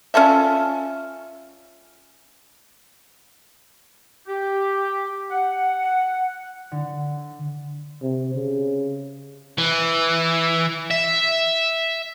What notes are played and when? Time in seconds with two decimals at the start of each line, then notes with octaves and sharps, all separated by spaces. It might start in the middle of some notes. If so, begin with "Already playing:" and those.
0.14 C#4 F4 A4 E5
4.28 G4
5.30 F#5
6.72 D3
8.02 C3
8.34 C#3
9.58 E3
10.91 E5